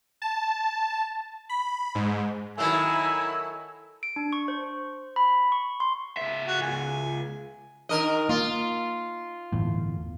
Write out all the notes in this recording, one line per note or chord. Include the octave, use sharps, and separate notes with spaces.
A5
B5
G#2
D#3 F#3 A3 E4 G#5 E6
D7
D4
C#6
C5
B5
C#6
C6
C#2 E5
F#4
G#5
D#3 A#4 D#5
A#3 F4
G1 E2 A2